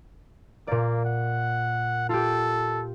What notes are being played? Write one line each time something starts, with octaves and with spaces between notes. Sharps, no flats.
A#2 A#3 D5
F#5
F4 G4 A4